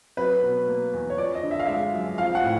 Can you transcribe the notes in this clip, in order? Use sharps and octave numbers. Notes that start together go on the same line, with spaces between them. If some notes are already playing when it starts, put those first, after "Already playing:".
F#3 B4
B2
A#3
E2
C#5
F3 D5
D#5
D3
E5
F5
G#3 E5
F#2
F3 F5
F#5
A2